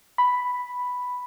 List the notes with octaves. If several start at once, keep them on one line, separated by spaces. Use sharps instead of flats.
B5